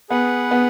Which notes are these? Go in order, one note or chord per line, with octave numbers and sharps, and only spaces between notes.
B3 G#4 B4 F#5
B3